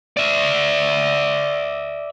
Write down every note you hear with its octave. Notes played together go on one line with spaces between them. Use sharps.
D5 E5